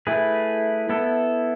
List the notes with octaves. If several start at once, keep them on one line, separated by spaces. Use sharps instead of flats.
A3 E4 G#4 B4
B3 E4 A4